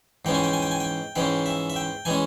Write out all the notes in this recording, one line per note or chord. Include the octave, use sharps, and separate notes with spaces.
G#2 E3 G#3 C#4 G5
G#5
G5
G#5
G5
G#5
G5
G#2 E3 G#3 C#4 G5
E5
E5
G5
E3 G#3 C#4 G#5